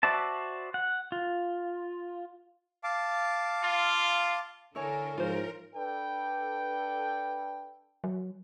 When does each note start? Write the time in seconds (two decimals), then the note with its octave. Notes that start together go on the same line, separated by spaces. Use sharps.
0.03 F#4 C5 D5 E5 A5
0.74 F#5
1.12 F4
2.84 F5 A5 D6
3.64 F4
4.75 D3 E4 A4 A#4 C#5 G#5
5.18 G#2 F3 F4 A#4 C5
5.74 D4 A4 B4 G5
8.04 F#3